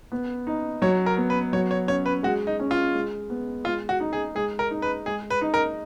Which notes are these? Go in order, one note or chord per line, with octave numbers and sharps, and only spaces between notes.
B3
D#4
F#3 C#5
A#4
B3
B4
F#3 C#5
C#5
C#4 C#5
B4
G#3 F#4
D#4
C#4
F4
G#3
B3
G#3 F4
F#4
D#4
G#4
G#3 G#4
A#4
D#4
B4
G#3 G#4
B4
D#4
A#4